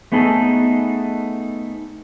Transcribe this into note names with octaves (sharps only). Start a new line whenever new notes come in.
A3 B3 D#4 G#4 A4